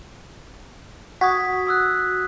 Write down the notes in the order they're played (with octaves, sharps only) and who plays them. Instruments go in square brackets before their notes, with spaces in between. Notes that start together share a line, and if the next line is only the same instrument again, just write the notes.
[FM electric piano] F#4 [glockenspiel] D#6 G#6 B6
[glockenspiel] D#6 E6 F#6